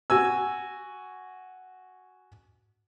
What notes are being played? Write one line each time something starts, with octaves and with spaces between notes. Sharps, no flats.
F#4 G#5 E6